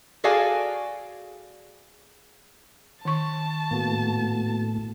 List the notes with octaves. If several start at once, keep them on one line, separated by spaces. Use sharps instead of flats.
F#4 G#4 A4 D5 F5 G#5
D#3 A5 C#6
A2 A#3 B3 F#4